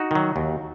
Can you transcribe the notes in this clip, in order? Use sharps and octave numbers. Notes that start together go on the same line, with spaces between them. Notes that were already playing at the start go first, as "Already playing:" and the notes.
Already playing: D#4 F#4
D#3 F#3
D#2